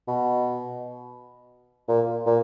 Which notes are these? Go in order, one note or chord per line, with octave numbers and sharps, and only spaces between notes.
B2
A#2
A#2